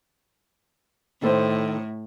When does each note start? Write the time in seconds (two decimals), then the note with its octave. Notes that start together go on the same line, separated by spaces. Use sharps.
1.22 A2 D#3 A4 C5